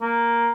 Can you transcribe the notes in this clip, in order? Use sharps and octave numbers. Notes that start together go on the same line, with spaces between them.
A#3